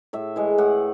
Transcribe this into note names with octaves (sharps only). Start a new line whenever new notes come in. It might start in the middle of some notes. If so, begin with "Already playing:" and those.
A2 E5
E3 G#3
A2 F#5